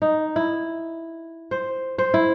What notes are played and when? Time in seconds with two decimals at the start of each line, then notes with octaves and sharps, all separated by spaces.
0.02 D#4
0.36 E4
1.51 C5
1.98 C5
2.14 E4